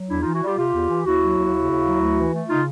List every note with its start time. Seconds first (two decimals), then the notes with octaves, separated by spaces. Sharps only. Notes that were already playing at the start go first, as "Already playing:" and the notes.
Already playing: F#3
0.10 E2 D4 E4
0.21 E3 D#4 F4
0.33 E4 F#4
0.42 G3 F4 G4
0.57 C3 F4 G4
0.73 E2
0.89 E3
1.06 D#2 E4 F#4
1.21 F#3
1.37 D#2
1.54 C#3
1.70 D#2
1.85 F#3
2.01 D2
2.17 E3
2.33 A3
2.49 C#3 D#4 F4